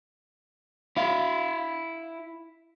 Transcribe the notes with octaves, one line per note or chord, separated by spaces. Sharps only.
E4 F5